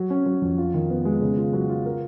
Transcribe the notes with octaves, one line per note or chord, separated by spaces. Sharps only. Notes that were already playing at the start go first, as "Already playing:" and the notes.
Already playing: F#3
C#4
F#3
F2
F4
D#3
B3
G#3
C#3
F4
F#3
F4
A#4